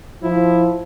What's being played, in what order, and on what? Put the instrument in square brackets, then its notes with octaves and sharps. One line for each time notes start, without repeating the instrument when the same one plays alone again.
[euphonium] F3 [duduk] E4